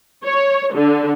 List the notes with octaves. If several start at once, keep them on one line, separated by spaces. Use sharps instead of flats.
C#5
D3